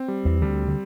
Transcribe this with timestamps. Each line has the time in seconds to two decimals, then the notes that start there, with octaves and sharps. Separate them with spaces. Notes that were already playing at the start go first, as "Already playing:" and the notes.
Already playing: C4
0.08 G3
0.25 E2 E3
0.42 D2 D3 G3
0.68 D3